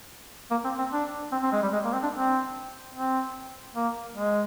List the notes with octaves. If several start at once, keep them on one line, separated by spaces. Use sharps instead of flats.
A#3
C4
C4
D4
C4
C4
G#3
G3
G#3
A#3
C4
D4
C4
C4
A#3
G#3